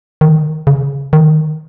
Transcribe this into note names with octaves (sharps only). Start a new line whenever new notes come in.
D#3
C#3
D#3